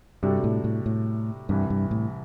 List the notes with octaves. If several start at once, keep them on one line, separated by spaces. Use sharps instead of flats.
G2 C3 G3 D4 F#4 A4
A2
A2
A2
C2 G2 C3 E3
G2
A2